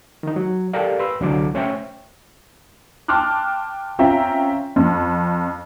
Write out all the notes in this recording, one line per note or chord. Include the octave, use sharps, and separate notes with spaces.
D#3 D#4
F#3
G4 A4 A#4 D5 F5
B4 C6 E6
C2 D3 F#3 A4 D6
A3 C#4 C5 C#5 E5 G5
G5 A5 C6 D6 F6 F#6
C4 C#4 F4 E5 G5 A#5
F2